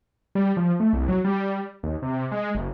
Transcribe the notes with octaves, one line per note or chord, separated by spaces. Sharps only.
G3
F3
A3
C2
F#3
G3
D#2
C3
G#3
F#1